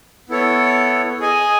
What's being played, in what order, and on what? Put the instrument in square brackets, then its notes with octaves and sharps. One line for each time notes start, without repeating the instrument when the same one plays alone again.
[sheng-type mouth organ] B3 E4 A4 C#5
G#4 D#5 G#5